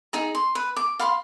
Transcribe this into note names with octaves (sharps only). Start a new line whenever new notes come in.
D#4 G#4 A#5
C6
B4
D6
F5 B5 C6